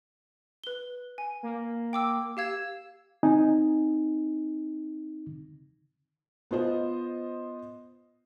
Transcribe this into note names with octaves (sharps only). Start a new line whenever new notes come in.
B4 G7
G#5
A#3
G5 D6 E6
G4 F5 E6 G#6
C4 D#4 G#5
B3 F4 C5 D#5